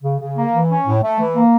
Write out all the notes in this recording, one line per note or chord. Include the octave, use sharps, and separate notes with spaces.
C#3
C#3
A#3
E3
C#4
A2
A3
E3
A#3